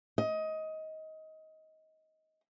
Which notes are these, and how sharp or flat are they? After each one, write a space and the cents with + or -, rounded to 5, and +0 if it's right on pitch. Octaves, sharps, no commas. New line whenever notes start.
D#5 +20